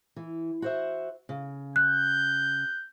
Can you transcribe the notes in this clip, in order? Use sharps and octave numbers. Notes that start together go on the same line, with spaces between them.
E3
F#4 C5 E5
C#3
F#6 G6